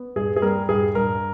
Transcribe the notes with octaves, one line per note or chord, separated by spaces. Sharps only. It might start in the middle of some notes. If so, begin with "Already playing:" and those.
Already playing: B3
G2 G#4
G#4
G3 A#4
G2 G#4
G2 A#4